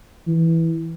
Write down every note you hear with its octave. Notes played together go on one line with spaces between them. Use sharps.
E3